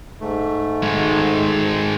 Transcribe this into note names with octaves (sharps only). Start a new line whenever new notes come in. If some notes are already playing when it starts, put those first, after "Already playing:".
G#2 A3
D#3 G#3